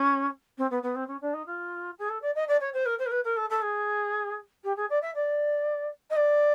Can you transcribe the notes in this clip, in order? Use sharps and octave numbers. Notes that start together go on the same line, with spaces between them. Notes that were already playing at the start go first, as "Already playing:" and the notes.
Already playing: C#4
C4
B3
B3
C4
C#4
D4
D#4
F4
G#4
A4
D5
D#5
D5
C#5
C5
A#4
C5
A#4
B4
A#4
A4
A4
G#4
G4
G#4
D5
E5
D5
D#5
D5